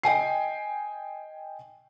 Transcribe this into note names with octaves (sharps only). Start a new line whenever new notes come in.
D#5 G5 G#5 C7